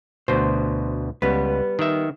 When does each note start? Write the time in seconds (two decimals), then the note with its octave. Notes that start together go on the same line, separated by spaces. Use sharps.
0.28 D2 B2 C5
1.22 C#2 G3 B3 B4
1.79 D#3 E5